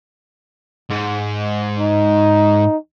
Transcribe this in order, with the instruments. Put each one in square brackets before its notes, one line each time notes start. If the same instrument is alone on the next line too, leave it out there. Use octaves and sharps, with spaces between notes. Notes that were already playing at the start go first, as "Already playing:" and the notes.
[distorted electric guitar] G#2
[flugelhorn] D#4